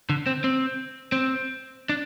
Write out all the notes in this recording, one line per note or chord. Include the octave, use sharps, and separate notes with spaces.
D3
C4
C4
C4
D4